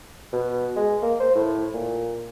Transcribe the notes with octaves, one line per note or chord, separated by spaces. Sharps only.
B2
G#3
A#3
C5
A2
A#2